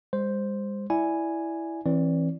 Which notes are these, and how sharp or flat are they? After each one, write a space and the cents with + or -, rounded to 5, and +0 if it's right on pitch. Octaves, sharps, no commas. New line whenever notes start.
G#3 -45 C5 +0
E4 +0 D5 +0 G#5 +0
E3 +0 C4 +35 D5 -20